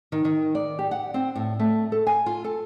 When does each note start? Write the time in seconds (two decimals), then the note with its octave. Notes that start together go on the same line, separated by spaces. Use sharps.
0.12 D#3
0.25 D#3
0.55 D5
0.79 G4
0.91 F#5
1.14 C4
1.35 A2
1.59 A3
1.92 A4
2.07 G#5
2.26 F4
2.44 A4